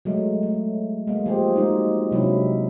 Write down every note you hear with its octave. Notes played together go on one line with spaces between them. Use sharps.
F#3 G#3 A3
A3
G#3 A#3
F3 G4 G#4 C5
G#3 A#3 D#4 F#4
C3 F#3 G#3 D4 E4